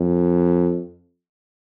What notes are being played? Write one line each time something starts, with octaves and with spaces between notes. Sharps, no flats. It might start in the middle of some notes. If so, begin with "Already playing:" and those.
Already playing: F2